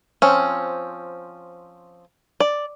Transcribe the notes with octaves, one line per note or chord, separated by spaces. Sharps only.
F3 C4 C#4
D5